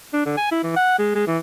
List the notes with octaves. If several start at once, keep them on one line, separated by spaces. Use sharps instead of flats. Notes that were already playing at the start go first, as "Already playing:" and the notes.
D4
D3
G#5
E4
E3
F#5
G#3
G#3
E3